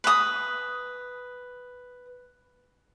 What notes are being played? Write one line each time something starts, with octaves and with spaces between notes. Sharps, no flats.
B4 D#6